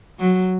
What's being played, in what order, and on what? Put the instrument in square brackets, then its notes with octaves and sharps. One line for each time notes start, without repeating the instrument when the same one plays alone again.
[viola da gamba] F#3